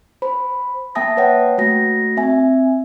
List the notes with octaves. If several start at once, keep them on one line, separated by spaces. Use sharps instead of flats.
C5 B5
A#3 E5 G5 A5 D#6 A#6
A#3 B4 C#5 F#5 G5
A3 F#4 A#6
C4 E5 G#5